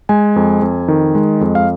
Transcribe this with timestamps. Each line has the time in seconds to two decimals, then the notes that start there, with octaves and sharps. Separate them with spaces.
0.09 G#3 G#5
0.36 F2
0.62 F2
0.88 D#3
1.15 G#3
1.41 F2
1.55 F5